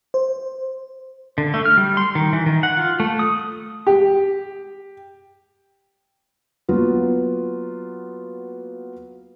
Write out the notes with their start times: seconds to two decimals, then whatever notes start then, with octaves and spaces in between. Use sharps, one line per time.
0.14 C5
1.38 D3
1.54 A3
1.65 F6
1.77 G3
1.97 C6
2.15 D#3
2.33 E3
2.46 D#3
2.63 F#5
2.77 F4
3.00 A3
3.19 D#6
3.87 G4
6.69 F#3 A#3 B3 F4